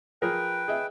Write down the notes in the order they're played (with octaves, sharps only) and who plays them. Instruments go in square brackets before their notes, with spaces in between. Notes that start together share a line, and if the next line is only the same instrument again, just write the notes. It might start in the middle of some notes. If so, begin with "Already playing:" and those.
[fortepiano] F3 G#4 A#4 [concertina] B4 G5
[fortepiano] G#4 D#5 E5